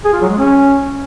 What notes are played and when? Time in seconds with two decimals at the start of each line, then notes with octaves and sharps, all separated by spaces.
0.05 G#4
0.13 F4
0.21 F#3
0.30 G#3
0.38 C#4